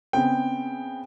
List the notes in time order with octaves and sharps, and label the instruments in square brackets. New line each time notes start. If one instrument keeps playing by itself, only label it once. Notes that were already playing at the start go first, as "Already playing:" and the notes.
[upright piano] C#3 B3 C4 [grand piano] G5